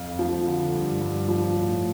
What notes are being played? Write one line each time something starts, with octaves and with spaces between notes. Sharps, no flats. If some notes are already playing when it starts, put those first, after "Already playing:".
Already playing: F2 F5
F3
D3
G2
G2
F3
A2